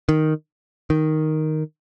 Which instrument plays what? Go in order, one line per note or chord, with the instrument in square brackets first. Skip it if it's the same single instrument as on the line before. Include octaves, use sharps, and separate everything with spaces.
[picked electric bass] D#3
D#3